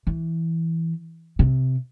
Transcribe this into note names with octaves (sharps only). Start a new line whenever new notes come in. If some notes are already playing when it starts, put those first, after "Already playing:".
E3
C3